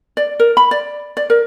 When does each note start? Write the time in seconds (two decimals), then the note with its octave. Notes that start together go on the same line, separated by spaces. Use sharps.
0.17 D5
0.40 A#4
0.57 B5
0.71 D5
1.17 D5
1.30 A#4